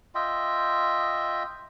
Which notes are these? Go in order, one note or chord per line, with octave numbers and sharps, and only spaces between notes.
F4 D#5 E5 G5